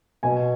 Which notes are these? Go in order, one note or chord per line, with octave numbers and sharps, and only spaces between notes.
B2 G#5